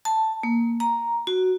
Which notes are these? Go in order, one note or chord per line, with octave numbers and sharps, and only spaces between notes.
A5
A#3
A#5
F#4